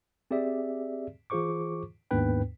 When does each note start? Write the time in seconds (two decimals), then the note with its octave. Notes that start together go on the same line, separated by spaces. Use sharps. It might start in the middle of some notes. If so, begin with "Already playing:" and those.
0.31 C4 G4 G#4 D5 E5
1.30 E3 F4 G#4 C5 C#6 D6
2.11 D#2 G#2 B3 D4 B4 G5